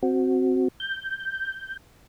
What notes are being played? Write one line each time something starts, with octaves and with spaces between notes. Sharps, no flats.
C4 F#4
G6